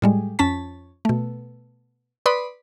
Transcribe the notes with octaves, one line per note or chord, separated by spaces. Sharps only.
A2 G3 G#3
F2 C#4 A5 B6
B2 A3
B4 D5 B5 C6 D#6